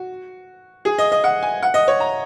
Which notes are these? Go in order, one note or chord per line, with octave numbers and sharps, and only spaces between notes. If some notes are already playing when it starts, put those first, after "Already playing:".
Already playing: F#4
G#4
D#5
D#5
F#5
G#5
F#5
D#5
C#5
A#5